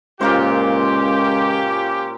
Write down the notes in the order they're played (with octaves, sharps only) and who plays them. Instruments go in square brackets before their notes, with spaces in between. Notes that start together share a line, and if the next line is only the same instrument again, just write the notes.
[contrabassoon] C#2 [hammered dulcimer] A#2 A#3 C5 [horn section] C#4 F4 G4